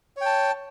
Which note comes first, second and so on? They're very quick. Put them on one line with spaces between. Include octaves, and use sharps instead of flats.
C#5 G5 A5